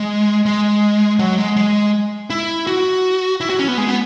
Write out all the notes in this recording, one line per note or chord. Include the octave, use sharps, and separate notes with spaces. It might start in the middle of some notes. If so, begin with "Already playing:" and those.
Already playing: G#3
G#3
F#3
G#3
G#3
E4
F#4
E4
F#4
C#4
B3
G#3
B3